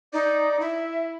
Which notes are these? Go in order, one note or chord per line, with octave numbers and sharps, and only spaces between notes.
D#4 D5
E4 E5